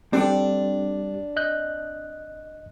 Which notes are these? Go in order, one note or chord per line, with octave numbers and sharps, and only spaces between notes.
G3 C4 D4 A4 G5
D#5 F#6 G6